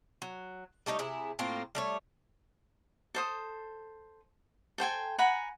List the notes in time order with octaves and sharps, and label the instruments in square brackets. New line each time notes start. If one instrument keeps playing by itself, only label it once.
[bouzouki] F#3
G3 A3 D#4 C#5
C3 E4 G#4
A2 A#3 C4 F4
G3 A3 C#5
[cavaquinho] A4 C5 D#6
A4 C5 G5 G#5
F#5 G#5 A#5 B5